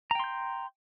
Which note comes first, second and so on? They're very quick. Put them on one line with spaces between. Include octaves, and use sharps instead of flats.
A#5 G5 C6 G6